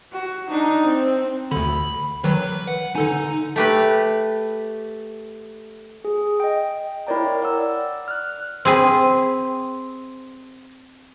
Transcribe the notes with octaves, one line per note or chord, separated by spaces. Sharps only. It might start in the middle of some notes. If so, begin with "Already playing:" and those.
F#4
D4 D#4
C4
D2 D3 B5
D#3 E3 F#3 B4
F#5
D3 D#4 A4 G#5
A3 G4 B4
G#4
D#5 G5
E4 A#4 C#5 D5 G5 A#5
D5 F#5 E6
F6 F#6
C4 G#4 G#5 B5